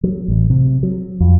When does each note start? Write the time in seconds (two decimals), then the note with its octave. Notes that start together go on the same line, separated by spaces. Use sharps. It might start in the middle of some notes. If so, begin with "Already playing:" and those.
0.03 F#3
0.28 A1
0.50 C3
0.83 F#3
1.20 F2